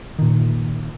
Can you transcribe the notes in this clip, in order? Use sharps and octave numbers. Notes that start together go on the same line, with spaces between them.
A#2 D#3